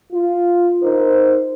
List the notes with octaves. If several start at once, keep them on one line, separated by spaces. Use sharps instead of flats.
F4
D#4 A#4 C5